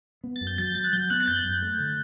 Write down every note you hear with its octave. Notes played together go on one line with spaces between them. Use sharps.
B3
A6
F#2
G6
F#3 A6
F#3 A6
F#6
F#3 G6
B3 F#6
A6
F#2 G6
F#2
A3
D3